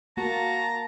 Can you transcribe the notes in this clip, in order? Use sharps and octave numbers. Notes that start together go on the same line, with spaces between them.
A#3 F#4 A5 A#5